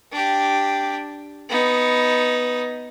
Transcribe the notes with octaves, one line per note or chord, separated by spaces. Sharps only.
D4 G4
B3 D#4